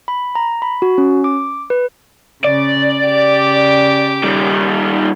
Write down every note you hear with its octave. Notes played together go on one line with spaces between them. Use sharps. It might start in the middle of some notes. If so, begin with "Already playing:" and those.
B5
A#5
B5
F#4
C#4
D6
B4
C#3 D5
C#3 G4 D6
D#3 G3